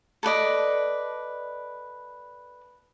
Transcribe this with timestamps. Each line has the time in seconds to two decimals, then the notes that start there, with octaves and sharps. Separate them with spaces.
0.23 A4 B4 D5 D#5